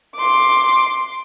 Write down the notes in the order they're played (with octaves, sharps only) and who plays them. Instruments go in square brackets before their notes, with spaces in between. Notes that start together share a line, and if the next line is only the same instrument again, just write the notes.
[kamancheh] C6 D6